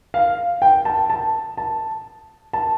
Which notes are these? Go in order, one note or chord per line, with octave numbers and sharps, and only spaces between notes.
F5
G5
A5
A5
A5
A5